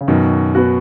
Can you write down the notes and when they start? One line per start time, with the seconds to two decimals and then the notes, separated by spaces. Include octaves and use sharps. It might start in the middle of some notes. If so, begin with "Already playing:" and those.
0.01 C#3
0.08 F#2 B2 D#3
0.55 B3 F#4